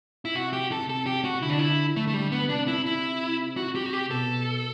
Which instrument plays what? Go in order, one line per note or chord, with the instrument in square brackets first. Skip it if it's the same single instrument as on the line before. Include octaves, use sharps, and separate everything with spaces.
[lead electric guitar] E4
[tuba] C3 [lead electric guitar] F#4
[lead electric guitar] G4
A4
[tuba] C3 [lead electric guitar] A4
[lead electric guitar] G4
F#4
[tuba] D3 [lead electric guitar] E4
[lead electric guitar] D4
E4
[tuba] D3 [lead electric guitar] A3
[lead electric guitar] A3
G3
B3
[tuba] C3 [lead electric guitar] D4
[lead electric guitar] E4
E4
F#4
G4
F#4
G4
[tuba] B2 [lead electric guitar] A4